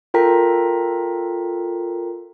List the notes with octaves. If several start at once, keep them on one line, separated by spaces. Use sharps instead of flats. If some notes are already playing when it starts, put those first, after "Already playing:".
F4 A4 A#4 G5 A#5 B6